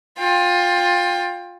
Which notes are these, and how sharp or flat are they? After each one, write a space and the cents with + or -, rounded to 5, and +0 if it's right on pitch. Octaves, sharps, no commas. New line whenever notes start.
F4 +20 G5 +25